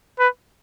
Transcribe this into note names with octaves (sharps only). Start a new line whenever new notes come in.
B4